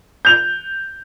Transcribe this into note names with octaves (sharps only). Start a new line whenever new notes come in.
G6 F7